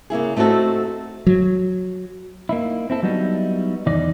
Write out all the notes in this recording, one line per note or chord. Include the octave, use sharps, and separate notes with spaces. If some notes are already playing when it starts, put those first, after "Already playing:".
C#3 A#3 E4 G#4
A3 C4 D#4 F#4 A4
F#3
A#3 D#4 E4
C4 E4 A4
F#3 G3 B3 D#4 E4
E2 D#3 E3 D#4 D5